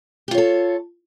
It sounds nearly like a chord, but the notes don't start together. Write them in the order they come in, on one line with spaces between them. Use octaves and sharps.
G4 F4 C#5 A4